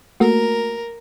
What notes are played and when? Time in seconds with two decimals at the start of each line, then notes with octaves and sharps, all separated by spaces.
0.20 A3 A#3 F#4 A#4